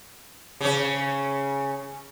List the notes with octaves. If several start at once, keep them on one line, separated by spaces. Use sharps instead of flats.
C#3 C#4